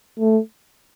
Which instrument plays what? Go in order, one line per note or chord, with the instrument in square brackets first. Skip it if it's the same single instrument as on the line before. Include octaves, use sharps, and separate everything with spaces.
[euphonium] A3